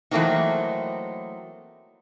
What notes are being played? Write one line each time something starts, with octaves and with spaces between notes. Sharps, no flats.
E3 F#3 A3 A#3 C4 D#4